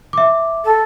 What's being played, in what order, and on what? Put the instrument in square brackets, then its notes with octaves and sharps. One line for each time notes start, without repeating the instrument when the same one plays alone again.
[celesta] E5 D6
[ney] A4